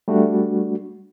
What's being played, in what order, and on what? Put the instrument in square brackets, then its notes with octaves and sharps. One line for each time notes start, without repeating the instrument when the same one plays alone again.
[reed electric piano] G3 A3 D4 F#4